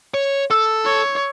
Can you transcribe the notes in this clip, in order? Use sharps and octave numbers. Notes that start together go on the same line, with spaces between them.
C#5
A4 E6
C#5